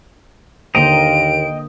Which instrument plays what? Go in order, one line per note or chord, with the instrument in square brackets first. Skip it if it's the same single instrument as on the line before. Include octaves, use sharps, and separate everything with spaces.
[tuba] D#2 [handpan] D3 A#3 C5 [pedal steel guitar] D#5 G5 A#5 [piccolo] D7